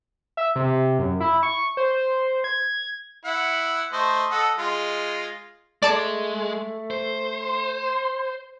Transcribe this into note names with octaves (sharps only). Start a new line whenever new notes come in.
E5
C3
F#2
E4
C#6
C5
G#6
E4 F#5
A3 C5 D#5
A4 D#5 F#5
G#3 F4
G#3 A3 D5 A5 D6
C5
C6